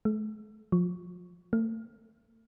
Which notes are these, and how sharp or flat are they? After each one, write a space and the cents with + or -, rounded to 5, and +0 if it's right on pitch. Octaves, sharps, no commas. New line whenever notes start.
A3 -45
F3 +25
A3 +35